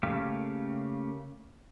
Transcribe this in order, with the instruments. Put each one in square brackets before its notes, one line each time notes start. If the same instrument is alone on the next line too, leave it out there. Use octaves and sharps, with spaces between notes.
[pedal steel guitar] C#3 A3 A#3 G4 F5